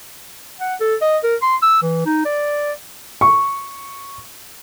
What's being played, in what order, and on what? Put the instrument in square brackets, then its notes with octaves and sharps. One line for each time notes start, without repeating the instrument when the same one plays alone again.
[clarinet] F#5
A4
D#5
A#4
C6
E6
E3
D#4
D5
[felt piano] C#6